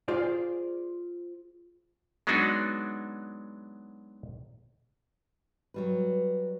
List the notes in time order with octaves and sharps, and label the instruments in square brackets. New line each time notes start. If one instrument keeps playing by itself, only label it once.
[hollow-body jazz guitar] F4 G#4 C5 D5
[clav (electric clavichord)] F#3 G#3 B3 D4 D#4 F#4
[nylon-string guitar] F#3 G3 B4